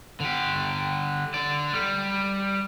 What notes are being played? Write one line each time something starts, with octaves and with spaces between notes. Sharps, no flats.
D3 G4
D3 D5
G3